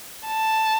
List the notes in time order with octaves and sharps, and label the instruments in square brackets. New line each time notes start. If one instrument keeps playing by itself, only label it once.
[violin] A5